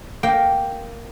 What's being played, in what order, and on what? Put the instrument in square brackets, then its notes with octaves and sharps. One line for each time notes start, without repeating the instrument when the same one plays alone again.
[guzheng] A#3 G5